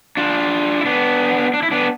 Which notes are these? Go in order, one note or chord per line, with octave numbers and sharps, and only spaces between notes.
D4 F4
E4
B3 D4
D4
E4
B3 D4